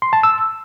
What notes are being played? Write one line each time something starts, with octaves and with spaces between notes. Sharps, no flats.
C6
A5
E6